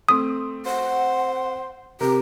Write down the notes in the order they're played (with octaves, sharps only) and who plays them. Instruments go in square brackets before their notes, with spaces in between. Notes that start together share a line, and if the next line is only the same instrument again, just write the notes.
[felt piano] A3 C4 [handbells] D#6
[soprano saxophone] C5 [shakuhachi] F#5
[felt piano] C3 [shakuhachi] G4 [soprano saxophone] A#4